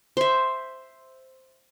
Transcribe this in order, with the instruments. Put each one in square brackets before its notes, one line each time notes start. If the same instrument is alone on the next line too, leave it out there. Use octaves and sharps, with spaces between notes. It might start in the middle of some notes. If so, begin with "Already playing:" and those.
[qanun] C5 E5